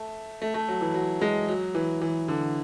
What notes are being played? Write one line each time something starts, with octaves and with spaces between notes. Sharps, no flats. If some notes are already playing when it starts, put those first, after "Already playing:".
Already playing: A3
A3
A3
F#3
E3
F#3
G#3
F#3
E3
E3
D3